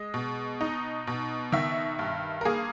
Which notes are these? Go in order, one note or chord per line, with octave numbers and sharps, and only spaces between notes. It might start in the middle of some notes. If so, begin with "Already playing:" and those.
Already playing: G#3 D#5
B2
D#4
B2
D#3 E5
G2
A#4
A#3 G#4